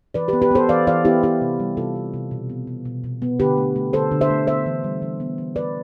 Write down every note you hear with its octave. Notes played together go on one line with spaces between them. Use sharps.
E3 B4 D5
G4 B4
B3
G4 B4
B3 A4 C5
E3 D5 F5
E3 D5 F5
B3 E4 G4
B3 E4 G4
C3
G3
C3 F4 A4
B3
C3
B2
B3
B3
B2
B2
B3
D3 G4 B4
A3
A3
D3 A4 C5
D3
C5 E5
A3
B3 C5 E5
E3
G3
E3
B3
E3
B3 B4 D5